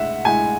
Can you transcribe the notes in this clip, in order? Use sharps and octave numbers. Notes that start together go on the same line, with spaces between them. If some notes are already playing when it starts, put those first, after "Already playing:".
Already playing: A2 G#3 E5 F#5
A2 G#3 G#5